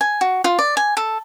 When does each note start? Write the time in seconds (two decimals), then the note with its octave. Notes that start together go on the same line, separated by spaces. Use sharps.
0.01 G#5
0.21 F#4
0.44 F4
0.59 D5
0.77 G#5
0.97 A4